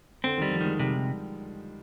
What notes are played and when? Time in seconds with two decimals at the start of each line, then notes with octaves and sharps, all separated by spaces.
0.24 D3 C4
0.38 D#3 G3
0.51 F3
0.61 D#3 G#3
0.79 C3 G3